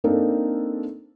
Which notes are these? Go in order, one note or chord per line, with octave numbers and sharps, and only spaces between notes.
A#3 C4 D4 D#4 A4 A#4